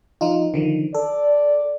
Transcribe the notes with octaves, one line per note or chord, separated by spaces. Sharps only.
F3 D#4 F4
D3 D#3 F3
A4 D5